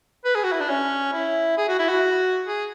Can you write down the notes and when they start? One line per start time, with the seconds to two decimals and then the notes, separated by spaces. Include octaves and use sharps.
0.25 B4
0.35 G#4
0.44 F#4
0.52 E4
0.60 D4
0.69 C#4
1.13 E4
1.57 G#4
1.68 F#4
1.79 E4
1.89 F#4
2.45 G#4